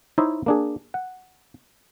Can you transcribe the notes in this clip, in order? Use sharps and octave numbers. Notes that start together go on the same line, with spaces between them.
D#4 E4 C5 C#5 D#5 E5
A#3 D4 G#4
F#5